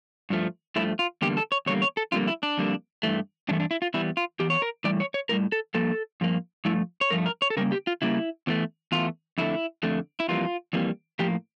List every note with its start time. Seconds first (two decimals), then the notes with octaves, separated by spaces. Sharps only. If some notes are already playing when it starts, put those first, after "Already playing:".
0.30 G2 F3 A3
0.76 G2 F3 A3 E4
0.99 F4
1.22 E2 D3 G3 A#3 G4
1.37 A4
1.52 C#5
1.66 E2 D3 G3 A#3 C#5
1.82 C#5
1.97 A4
2.12 F2 D3 G3 A#3 F4
2.27 E4
2.43 D4
2.58 F2 D3 G3 A#3
3.03 G2 E3 A3
3.49 G2 E3 A3 D4
3.60 D4
3.71 E4
3.82 F4
3.94 E2 E3 G3 E4
4.17 F4
4.40 E2 E3 G4
4.50 C#5
4.62 A#4
4.84 A2 E3 G3 D5
5.00 C#5
5.14 C#5
5.29 A2 E3 G3 A#4
5.52 A4
5.74 G2 F3 A#3 A4
6.21 G2 F3 A#3
6.65 G2 F3 A3 E4
7.01 C#5
7.10 G2 F3 A3 A#4
7.26 A#4
7.42 C#5
7.50 A4
7.57 C#3 G3 A#3 A#4
7.72 G4
7.87 F4
8.02 C#3 G3 A#3 E4
8.47 E2 E3 A3
8.92 E2 E3 A3 F4
9.38 F2 D3 A3 E4
9.83 F2 D3 A3
10.20 E4
10.28 F2 E3 G3 A#3 F4
10.73 F2 E3 G3 A#3
11.19 A2 F3 A#3 G4